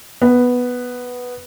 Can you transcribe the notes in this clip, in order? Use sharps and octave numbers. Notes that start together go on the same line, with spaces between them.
B3